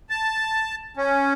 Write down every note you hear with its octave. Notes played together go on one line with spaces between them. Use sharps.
A5
C#4